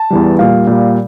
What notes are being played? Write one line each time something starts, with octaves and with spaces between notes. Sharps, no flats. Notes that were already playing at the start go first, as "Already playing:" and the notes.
Already playing: A5
E2 E3 G3
A#2 G3 F5
A#2 G3